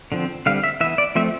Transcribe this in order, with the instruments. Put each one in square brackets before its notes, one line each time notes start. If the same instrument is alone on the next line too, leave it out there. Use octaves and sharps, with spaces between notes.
[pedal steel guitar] D3 F3 C4
D3 G3 C4 F5
E5
E3 E5
B3
D5
F3 A3 C4 E5